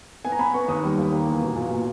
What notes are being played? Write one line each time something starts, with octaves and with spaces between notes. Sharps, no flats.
B3 G#5
A#5
B3 B5
B3 C#6
D#2 D#6
G3
D#2
A#3
E2
B2
A#2
A#2